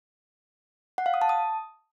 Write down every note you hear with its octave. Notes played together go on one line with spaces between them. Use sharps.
F#5
F5
D#6
A5
D#6